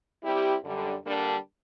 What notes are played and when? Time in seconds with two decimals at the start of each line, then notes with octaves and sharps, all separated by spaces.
0.23 G3 C4 E4 G4
0.63 F#2 D3 G3
1.04 D3 G3 A#3 D4